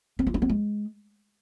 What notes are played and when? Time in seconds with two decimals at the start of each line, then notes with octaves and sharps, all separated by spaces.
0.19 C4
0.27 F4
0.34 C#4
0.42 C4
0.49 G#3